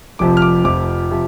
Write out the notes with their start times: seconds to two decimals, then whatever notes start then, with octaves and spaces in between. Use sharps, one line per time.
0.19 F1 F2 C3 F3 D6
0.37 F6
0.42 D6
0.64 F1 F2 C3 F3 D6
1.11 C3 F3